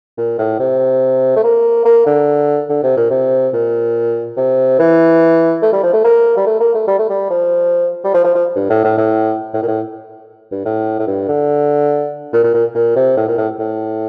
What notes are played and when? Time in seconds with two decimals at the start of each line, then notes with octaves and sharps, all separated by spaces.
0.17 A#2
0.38 A2
0.59 C3
1.36 A3
1.43 A#3
1.85 A#3
2.06 D3
2.69 D3
2.83 C3
2.97 A#2
3.11 C3
3.53 A#2
4.37 C3
4.79 E3
5.62 A3
5.73 G3
5.83 F3
5.93 A3
6.04 A#3
6.37 G3
6.46 A3
6.60 A#3
6.74 A3
6.87 G3
6.99 A3
7.09 G3
7.30 F3
8.04 G3
8.14 F3
8.24 F3
8.35 F3
8.56 G2
8.70 A2
8.84 A2
8.97 A2
9.54 A2
9.62 A#2
9.68 A2
10.52 G2
10.65 A2
10.99 A2
11.07 G2
11.28 D3
12.33 A#2
12.43 A#2
12.54 A#2
12.75 A#2
12.96 C3
13.17 A2
13.27 A#2
13.38 A2
13.59 A2